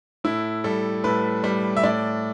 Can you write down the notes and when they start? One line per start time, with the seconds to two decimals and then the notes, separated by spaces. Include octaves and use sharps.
0.24 A2 E4
0.64 G3 A4
1.04 A2 B4
1.44 G3
1.77 E5
1.83 A2 D5